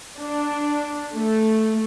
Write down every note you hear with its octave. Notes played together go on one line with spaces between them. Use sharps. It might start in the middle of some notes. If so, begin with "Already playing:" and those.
D4
A3